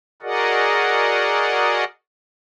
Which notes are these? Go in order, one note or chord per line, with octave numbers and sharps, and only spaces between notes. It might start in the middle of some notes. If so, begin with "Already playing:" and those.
F#4 G#4 A#4 D5 D#5 F#5